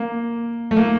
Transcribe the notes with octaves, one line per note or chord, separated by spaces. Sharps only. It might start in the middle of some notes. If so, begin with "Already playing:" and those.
Already playing: A#3
A3
A#3